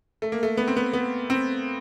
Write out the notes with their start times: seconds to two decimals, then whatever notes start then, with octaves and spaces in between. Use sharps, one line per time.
0.22 A3
0.32 A#3
0.43 A3
0.57 B3
0.68 C4
0.77 B3
0.93 B3
1.30 C4